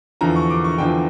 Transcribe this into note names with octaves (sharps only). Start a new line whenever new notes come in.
E2 D3 F3 A#5
C#6
D6
C#6
E2 D3 F3 G5